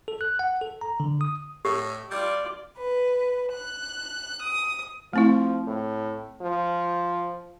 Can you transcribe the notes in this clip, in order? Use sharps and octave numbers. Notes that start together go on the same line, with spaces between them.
A4
F#6
F#5
A4
A#5
D3
D#6
A2 G4
G3 F4 D5
B4
F#6
D#6
F3 A3 C4 E4
A2
F3